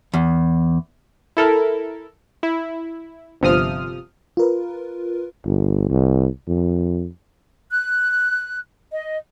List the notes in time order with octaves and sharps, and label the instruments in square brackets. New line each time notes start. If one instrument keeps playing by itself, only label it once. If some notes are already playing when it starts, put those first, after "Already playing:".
[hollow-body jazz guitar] E2
[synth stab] E4 A4 A#4
E4
G1 C3 F3 D#6 F6
[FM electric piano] F4 A#4 B4
[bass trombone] G1
C2
F2
[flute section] F#6
D#5